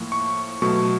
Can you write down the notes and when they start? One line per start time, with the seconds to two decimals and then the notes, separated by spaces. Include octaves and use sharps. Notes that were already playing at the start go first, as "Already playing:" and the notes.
Already playing: A2 F3 A#3
0.12 C#6
0.62 B2 F#3 A3 C#6